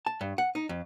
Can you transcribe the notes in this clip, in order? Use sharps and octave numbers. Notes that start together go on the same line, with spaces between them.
A5
G2
F#5
D#4
F2